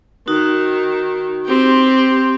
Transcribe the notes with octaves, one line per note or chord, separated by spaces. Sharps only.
D#3 D#4 F#4
C4 G4